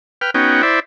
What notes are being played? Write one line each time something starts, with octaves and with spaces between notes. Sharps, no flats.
B4 G5 F6
B3 C#4 D#4 F#4 G5
E4 C5 D5 E5